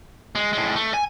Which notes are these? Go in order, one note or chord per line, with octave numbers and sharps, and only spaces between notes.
G#3
A2 G#3
A3
G#5